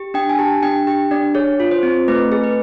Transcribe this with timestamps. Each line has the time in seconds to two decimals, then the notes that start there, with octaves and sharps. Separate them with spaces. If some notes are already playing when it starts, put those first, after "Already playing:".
Already playing: G4
0.14 D4 G5
0.29 G#5
0.39 G4 A5
0.62 D4 G5
0.87 G4 G5
1.11 D4 D5
1.35 G#4 C#5
1.60 F4
1.71 C5
1.83 C4
2.08 A3 B4
2.32 G#4
2.44 B4